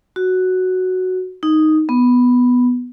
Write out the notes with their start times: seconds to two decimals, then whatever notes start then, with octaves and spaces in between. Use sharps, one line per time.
0.16 F#4
1.43 D#4
1.89 B3